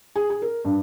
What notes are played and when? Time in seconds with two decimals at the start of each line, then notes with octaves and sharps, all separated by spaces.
0.16 G#4
0.30 G#4
0.42 A#4
0.65 G2